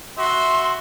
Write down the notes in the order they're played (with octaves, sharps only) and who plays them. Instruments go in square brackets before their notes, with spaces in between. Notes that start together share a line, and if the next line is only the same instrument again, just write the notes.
[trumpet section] F#4 E5 [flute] C6